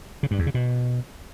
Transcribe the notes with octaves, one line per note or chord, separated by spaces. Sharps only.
C#3
G2
E2
C#3
B2